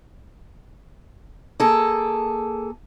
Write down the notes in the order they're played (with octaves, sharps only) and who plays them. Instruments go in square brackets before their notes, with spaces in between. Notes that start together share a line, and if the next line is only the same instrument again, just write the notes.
[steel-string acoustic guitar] A#3 G#4 A4